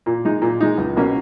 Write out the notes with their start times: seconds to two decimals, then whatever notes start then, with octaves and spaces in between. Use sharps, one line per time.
0.06 A#2
0.25 G#3 D#4
0.42 A#2
0.61 G#3 D#4
0.78 C#2
0.97 B2 A#3 C#4